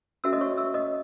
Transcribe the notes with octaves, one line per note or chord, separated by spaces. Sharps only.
C#4 F#4 A4 E5 E6
D#5 D#6
C#5 C#6
E5 E6
D#5 D#6